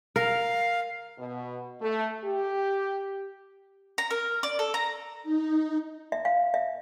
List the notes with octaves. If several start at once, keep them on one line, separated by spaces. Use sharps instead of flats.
A#4 F5
B2
A3
G4
A#5
A#4
D5
A4
A#5
D#4
E5
F5
E5